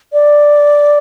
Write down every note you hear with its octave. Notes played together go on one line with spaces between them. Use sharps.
D5